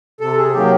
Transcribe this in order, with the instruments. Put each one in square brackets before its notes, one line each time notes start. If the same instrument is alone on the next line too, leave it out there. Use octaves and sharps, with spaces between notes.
[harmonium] C3 A4
G#4
D#3 F#3 A#3 G4